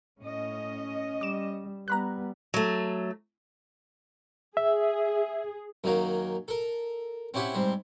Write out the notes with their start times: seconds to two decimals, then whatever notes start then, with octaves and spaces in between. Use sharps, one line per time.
0.21 A2 C#4 D#5
1.21 G3 D6 E7
1.88 G3 B3 A#5 B5 F#6
2.54 F#3 A3
4.57 G#4 E5
5.84 F#2 D#3 F#3 A#3
6.48 A4 A#4
7.34 C4 C#4 E4 G4 E5 F#5
7.54 G#2 G3 C4